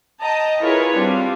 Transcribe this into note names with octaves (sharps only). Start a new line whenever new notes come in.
D#5 G5 A5 A#5 D#6
E4 F4 G#4 A#4 B4 C#5
G3 C4 D4 F4